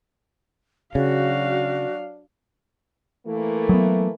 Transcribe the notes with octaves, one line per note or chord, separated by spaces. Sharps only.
C#3 F#3 D4 F#4 F5
E3 A3 A#3
F#3 B3